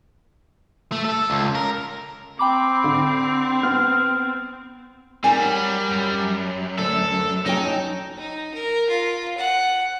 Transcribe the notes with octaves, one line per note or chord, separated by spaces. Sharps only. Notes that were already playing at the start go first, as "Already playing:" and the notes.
A3
A4
C#2
A#4
C4 G5 B5 D6
D3
B3 F6
G3 C4 D#4 A#4 G#5
C#5 F#5
F#2
D2 A4
F#3 C#4 D#4 G5
D#4
A#4
F4
F#5